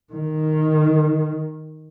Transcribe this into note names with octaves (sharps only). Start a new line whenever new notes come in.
D#3